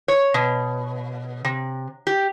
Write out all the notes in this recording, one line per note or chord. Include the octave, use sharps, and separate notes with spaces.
C#5
B2
C3
G4